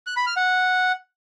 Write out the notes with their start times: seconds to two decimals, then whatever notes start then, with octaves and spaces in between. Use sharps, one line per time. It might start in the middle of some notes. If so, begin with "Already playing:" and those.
0.07 F#6
0.17 B5
0.26 F6
0.36 F#5